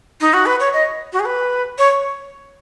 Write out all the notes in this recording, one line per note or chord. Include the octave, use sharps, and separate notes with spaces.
D#4
F#4
B4
C#5
D#5
F#4
G#4
B4
C#5